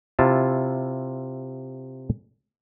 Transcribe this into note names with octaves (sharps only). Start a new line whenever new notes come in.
C3 E4 F4 A5